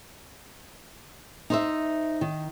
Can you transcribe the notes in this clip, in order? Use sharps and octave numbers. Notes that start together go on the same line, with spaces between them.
D#4 C5 E5
D#3